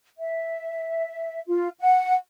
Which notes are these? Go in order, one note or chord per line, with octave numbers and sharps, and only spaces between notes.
E5
F4
F#5